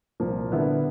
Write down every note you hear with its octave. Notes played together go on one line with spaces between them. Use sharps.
C2 A#2 F3 A#3
D3 G3 B3 E4